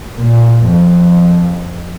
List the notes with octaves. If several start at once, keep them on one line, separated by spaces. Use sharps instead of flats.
A#2
F2